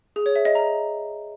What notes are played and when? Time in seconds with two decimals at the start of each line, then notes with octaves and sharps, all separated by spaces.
0.16 G#4
0.26 C#5
0.36 E5
0.45 D#5
0.55 A#5